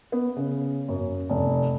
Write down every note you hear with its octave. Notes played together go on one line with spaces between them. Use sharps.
B3
C#3
F#2
F1